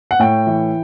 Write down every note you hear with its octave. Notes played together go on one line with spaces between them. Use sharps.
F#5
A2 G5
E3